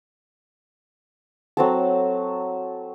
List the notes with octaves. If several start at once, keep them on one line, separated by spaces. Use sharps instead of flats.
F#3 C4 A4